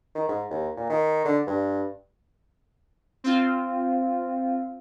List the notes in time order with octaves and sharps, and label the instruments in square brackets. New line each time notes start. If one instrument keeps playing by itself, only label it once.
[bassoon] D#3
G#2
D#2
A#2
D#3
D3
G2
[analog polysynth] C4 F4